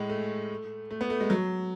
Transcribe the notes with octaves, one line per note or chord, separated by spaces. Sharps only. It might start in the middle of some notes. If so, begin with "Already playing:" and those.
Already playing: A2 G#3
A3
A3
B3
A3
G#3
F#3